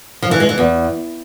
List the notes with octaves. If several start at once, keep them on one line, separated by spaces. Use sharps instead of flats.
F3
E3
G#3
E3
E2